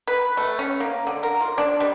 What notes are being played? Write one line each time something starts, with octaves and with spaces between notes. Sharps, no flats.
B4
A3
C#4
A#3
D3
A#4
F4
D4
G3